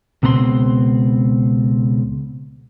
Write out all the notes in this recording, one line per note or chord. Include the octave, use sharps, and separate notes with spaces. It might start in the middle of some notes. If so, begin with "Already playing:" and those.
C#2 B2 C4 A#5 C6